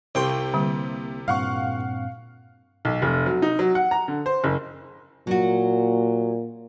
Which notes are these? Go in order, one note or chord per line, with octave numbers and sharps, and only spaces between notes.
C2 C3 F5 G5 C6 C#6
D3 G3 A#3 C4
G2 A#2 C4 F5 F#5 C#6
B1
F1
F#3
D#4
F#3
F#5
A#5
D3
C5
F#1
A#2 F#3 F#4